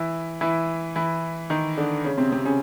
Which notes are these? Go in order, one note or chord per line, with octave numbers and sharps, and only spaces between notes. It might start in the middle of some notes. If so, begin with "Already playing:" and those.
Already playing: E3 E4
E3 E4
E3 E4
D#3 D#4
D3 D4
C#3 C#4
C3 C4
C3 C4
C#3 C#4